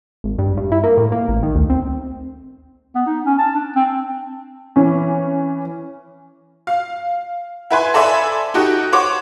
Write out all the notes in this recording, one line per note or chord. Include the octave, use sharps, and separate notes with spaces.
G#1
G2
G2
E4
A#3
A2
A#3
A1
D#3
D2
C4
B3
D#4
C#4
A5
D4
C4
E3 C#4
F5
E4 B4 G#5 C6
A4 C5 D5 E5 G#5 B5
D#4 F#4 G4 A4
C5 C#5 F#5 D6